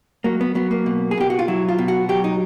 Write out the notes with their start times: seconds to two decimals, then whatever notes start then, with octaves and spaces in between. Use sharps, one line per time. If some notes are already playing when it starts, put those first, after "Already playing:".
0.24 F#3 A#3
0.41 B3
0.55 F#3 B3
0.71 A#3
0.86 B2
1.11 G#4
1.18 B2 G4
1.30 F#4
1.39 F4
1.48 F#3 E4
1.69 F4
1.79 B2
1.88 F#4
2.09 F#3 G4
2.24 D#4